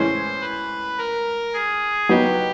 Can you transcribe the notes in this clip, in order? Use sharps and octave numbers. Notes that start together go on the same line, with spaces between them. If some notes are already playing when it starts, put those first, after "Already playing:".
Already playing: A2 E3 G#3 C#4 C5
B4
A#4
G#4
F#3 B3 D#4 F#4 G4